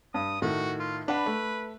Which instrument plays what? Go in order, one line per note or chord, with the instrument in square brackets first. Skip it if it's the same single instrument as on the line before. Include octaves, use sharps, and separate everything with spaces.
[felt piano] G2 [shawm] D#6
[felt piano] A2 D#3 [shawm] F#4
[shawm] F4
[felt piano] D4 F#5 B5 [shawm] B4
[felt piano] A3